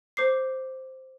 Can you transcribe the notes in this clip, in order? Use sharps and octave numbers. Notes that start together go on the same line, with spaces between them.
C5 D6 C7